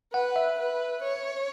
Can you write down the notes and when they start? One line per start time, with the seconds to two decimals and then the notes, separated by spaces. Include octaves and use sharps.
0.13 B4 F#5
0.36 E5
0.59 B4
1.02 C#5